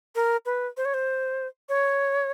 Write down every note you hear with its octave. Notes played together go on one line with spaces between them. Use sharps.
A#4
B4
C5
C#5
C5
C#5